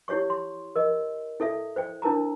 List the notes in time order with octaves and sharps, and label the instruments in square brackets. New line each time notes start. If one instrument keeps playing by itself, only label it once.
[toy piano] E4 G4 C#5 D5 C#6
C6
A#4 D#5
E4 A4 D5 E5
C5 D5 G5
D4 E4 A#4 A5 A#5